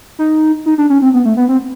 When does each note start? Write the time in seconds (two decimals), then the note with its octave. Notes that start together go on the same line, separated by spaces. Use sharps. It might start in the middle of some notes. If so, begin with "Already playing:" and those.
0.19 D#4
0.66 D#4
0.78 D4
0.90 C#4
1.02 C4
1.14 B3
1.25 A3
1.37 B3
1.49 C4